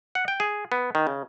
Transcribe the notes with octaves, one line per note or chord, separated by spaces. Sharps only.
F#5
G5
G#4
B3
D#3
C#3